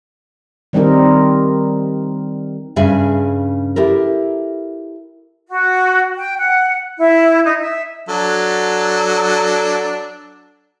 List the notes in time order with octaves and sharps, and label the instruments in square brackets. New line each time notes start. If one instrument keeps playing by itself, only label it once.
[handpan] D#3 G3 C4 D#4 A#4
[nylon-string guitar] G2 C#3 G#4 E5 G#5
E4 G4 A4 A#4
[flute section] F#4
G5
F#5
E4
D#4
E5
[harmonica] F#3 D4 A4